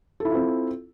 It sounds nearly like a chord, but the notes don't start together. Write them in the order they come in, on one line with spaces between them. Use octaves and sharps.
A4 E4 F4 C4